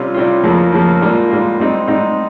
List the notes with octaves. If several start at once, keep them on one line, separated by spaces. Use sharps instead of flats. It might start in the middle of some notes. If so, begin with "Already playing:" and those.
Already playing: C3 G3 C#4 F4
C3 G3 C#4 F4
F2 C#3 F3 A#3
F2 C#3 F3 A#3
G#2 G3 A#3 F4
G#2 G3 A#3 F4
G#2 G3 C4 D#4
G#2 G3 C4 D#4